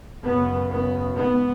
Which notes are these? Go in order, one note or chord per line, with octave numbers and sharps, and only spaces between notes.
F#2 C#3 B3
B3
G#2 B3